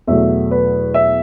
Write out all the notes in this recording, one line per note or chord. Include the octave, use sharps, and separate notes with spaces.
E2 B2 F#3 A3 E5
B4
E5